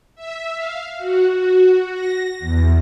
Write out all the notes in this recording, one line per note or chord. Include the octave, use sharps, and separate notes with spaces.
E5
F5
F#4
F#4
A#6
E2